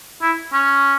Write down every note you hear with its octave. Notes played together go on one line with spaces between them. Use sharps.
E4
C#4